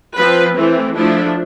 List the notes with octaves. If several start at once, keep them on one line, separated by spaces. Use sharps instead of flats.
F3 C4 B4
E3 A3 C4
F3 A3 D4 E4